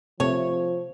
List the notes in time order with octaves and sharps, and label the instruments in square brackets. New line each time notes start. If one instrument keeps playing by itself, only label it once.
[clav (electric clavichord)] C3 A3 [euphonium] F3 [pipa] C#5